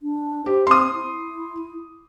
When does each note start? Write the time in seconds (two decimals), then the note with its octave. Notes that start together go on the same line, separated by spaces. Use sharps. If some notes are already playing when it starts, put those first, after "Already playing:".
0.02 D4
0.46 G4 C5
0.67 C4 C6 D#6
0.94 E4